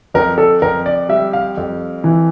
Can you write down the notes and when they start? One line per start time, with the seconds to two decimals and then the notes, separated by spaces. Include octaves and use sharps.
0.14 F2 A#4
0.38 A4
0.62 F2 A#4
0.86 D5
1.09 G3 E5
1.33 F5
1.57 F2
2.04 E3